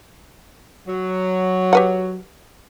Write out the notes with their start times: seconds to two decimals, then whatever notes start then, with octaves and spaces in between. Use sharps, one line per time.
0.87 F#3
1.73 G4 B4 F#5